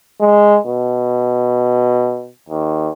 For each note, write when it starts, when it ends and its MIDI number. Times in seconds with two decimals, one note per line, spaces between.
0.21 0.59 56
0.67 2.29 47
2.49 2.90 39